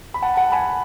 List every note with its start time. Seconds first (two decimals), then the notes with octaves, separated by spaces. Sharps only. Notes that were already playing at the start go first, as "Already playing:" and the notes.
0.14 B5
0.22 F#5 A5
0.37 F#5 A5
0.52 G#5 B5